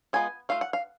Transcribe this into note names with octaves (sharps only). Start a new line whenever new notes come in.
G#3 B3 F4 G#5
A3 F4 F5
F#5
F5